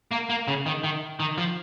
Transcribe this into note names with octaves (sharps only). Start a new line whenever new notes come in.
A#3
A#3
C#3
D#3
D#3
D#3
F3